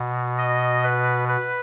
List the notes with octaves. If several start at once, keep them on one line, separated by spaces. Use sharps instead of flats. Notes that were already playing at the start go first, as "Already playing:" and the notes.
Already playing: B2
D#5
B4
B4